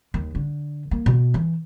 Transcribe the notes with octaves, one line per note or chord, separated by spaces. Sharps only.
D#2
D3
A#3
B2
E3